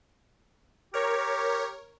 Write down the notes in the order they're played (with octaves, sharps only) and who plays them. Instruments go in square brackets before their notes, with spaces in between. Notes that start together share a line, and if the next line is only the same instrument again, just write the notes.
[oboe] G4 [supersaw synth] A#4 C#5